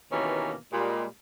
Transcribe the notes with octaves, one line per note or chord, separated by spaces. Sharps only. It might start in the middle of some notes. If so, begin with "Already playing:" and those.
D#2 B2 D#3 E3 A#3 C#4
A#2 G3 G#3